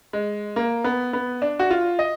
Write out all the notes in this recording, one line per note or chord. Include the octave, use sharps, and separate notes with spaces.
G#3
A#3
B3
B3
D4
F#4
F4
D#5